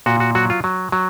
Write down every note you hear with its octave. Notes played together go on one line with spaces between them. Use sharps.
A#2 F#4
F#4
F#3 F#4
F4
F#3
F#3